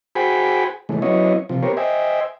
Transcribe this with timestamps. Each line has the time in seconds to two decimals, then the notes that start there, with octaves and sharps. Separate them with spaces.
0.15 F#4 G#4 C5 G5 G#5 B5
0.89 C#3 E3 G#3 A3
1.02 F#3 B3 C#4 E4 C#5 D#5
1.49 C3 F3
1.63 B3 G4 A#4 C5 C#5
1.77 C5 D#5 E5 G5 G#5